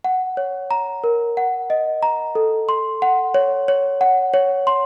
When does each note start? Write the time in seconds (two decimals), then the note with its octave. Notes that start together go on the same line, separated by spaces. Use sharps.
0.04 F#5
0.37 C#5
0.71 A#5
1.04 A#4
1.37 F#5
1.70 D#5
2.03 A#5
2.35 A4
2.69 C6
3.02 F#5
3.34 C#5
3.68 C#5
4.01 F#5
4.34 C#5
4.67 C6